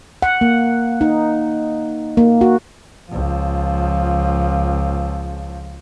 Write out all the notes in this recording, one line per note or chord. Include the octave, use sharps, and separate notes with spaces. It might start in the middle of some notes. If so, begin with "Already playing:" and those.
F#5
A#3
D#4
A#3
F#4
C#2 F3